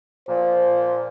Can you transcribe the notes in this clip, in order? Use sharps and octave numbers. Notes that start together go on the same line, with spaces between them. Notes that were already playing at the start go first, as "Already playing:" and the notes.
A#2 F3 C5